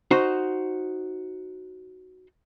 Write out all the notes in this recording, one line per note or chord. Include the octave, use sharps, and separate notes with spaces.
D#4 F#4 C5